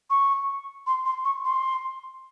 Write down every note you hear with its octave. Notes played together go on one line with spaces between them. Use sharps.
C#6
C6
C6
C#6
C6